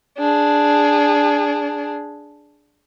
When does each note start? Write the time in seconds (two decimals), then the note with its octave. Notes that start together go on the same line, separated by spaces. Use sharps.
0.18 D4 G#4